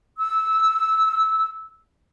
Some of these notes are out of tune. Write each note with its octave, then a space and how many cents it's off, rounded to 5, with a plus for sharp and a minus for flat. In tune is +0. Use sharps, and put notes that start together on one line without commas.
E6 -15